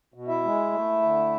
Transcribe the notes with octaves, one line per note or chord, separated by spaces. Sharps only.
B2
E4 E5
G#3
A3
D3